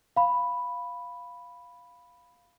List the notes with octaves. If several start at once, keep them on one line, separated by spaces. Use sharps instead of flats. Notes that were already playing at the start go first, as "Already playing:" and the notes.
F5 B5